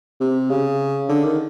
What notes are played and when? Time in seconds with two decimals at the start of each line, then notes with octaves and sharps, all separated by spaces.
0.20 C3
0.50 C#3
1.09 D3
1.24 D#3